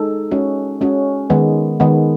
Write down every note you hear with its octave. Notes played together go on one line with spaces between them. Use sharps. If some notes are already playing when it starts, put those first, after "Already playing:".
Already playing: G#3 D#4 A4
G#3 C#4 F#4
G#3 C#4 F#4
D#3 G#3 B3
D#3 G#3 B3